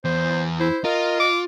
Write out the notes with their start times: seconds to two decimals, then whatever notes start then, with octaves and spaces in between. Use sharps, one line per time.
0.05 E2 C5
0.60 E4 C5
0.84 F4 A#4 D#5
1.20 D6